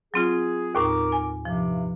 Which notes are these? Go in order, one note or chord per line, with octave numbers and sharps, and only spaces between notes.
F#3 C4 F4 G#4
D#2 A2 D#4 A#4 D6
G#5
G2 C3 F3